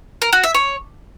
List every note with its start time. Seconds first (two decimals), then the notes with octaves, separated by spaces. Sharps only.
0.22 A#4
0.33 F#4
0.44 E5
0.55 C#5